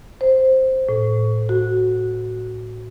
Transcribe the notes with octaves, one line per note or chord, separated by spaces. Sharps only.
C5
A2
F#4